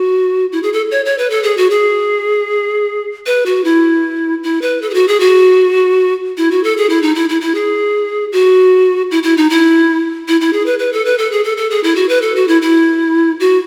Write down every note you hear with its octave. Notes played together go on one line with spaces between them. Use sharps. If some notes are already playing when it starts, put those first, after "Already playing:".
Already playing: F#4
E4
G#4
A4
C#5
C#5
B4
A4
G#4
F#4
G#4
B4
F#4
E4
E4
B4
A4
G#4
F#4
G#4
F#4
E4
F#4
A4
G#4
E4
D#4
E4
E4
E4
G#4
F#4
E4
E4
D#4
E4
E4
E4
G#4
B4
B4
A4
B4
A4
G#4
A4
A4
G#4
E4
F#4
B4
A4
F#4
E4
E4
F#4